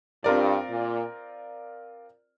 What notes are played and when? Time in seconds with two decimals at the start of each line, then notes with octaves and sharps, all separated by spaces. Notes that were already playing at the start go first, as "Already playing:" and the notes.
0.24 G2 C4 F4 A#4 D5
0.70 A#2